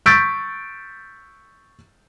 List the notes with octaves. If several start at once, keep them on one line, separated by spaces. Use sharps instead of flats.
C#6 E6 G6 A6 B6 D7